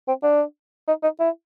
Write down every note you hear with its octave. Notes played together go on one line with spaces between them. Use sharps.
C4
D4
D#4
D#4
E4